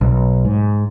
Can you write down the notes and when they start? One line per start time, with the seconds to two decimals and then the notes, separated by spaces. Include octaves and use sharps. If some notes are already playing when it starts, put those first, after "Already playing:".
0.01 B1
0.45 G#2